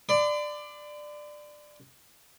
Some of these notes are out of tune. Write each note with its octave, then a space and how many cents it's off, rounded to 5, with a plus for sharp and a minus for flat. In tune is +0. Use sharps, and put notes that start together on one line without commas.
D5 +15 C6 -45